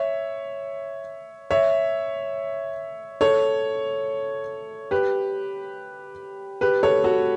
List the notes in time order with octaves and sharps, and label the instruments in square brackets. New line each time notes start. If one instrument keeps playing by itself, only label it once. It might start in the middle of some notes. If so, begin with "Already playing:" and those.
Already playing: [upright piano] C#5 E5
C#5 E5
A4 C#5
G4 B4
G4 B4
A4 C#5
F#4 A4